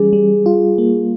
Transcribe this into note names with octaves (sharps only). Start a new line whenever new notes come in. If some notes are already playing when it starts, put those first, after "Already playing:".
Already playing: E3 G3 C#4 G#4
G3
F4
A#3